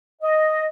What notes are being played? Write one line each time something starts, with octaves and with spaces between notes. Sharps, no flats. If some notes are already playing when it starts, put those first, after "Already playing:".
D#5